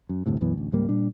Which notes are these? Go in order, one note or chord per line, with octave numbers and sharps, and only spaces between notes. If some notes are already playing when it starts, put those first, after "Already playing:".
F#2
G1 D2 A2 C3
B1 F#2 E3 B3
A1 D2
C#2 G#2 G3 A#3
A#2 G3 D4